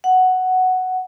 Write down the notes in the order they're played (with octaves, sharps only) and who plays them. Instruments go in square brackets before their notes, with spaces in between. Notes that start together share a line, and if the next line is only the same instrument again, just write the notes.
[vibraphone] F#5